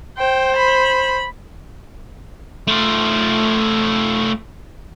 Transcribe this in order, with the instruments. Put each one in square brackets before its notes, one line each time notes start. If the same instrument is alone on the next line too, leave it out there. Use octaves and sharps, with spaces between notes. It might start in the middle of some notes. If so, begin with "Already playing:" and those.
[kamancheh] C5 [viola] G5
[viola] B5
[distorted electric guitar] A3 F4